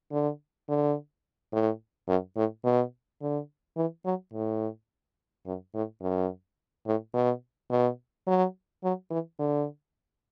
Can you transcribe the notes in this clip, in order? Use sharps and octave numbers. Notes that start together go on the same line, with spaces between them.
D3
D3
A2
F#2
A2
B2
D3
E3
F#3
A2
F#2
A2
F#2
A2
B2
B2
F#3
F#3
E3
D3